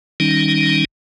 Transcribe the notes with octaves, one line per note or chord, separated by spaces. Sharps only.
D#3 G3 C#4 D#4